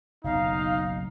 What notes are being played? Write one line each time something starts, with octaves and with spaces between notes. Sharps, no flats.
F#1 B1 D#4 F5